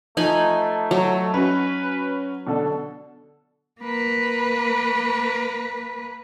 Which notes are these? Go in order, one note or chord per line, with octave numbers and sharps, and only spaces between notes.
F3 A3 D#4 G#5 B5
F#3
C#4 F#4 B4
B2 D3 D4 A4
A#3 B4